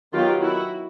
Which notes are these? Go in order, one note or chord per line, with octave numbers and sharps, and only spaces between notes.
D#3 F#3 B3 F4 G4
E4 F#4